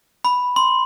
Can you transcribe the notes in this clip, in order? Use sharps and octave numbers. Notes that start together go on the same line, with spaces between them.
B5
C6